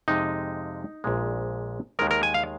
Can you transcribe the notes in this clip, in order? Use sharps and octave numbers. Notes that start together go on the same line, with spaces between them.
F2 C3 G#3 D#4
A#1 A#2 G#3
D#2 D#3 G#3 A#4
A#4
G#5
F5